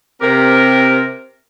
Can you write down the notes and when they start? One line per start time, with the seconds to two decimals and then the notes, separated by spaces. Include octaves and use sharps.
0.22 C3 C4 G4 A#4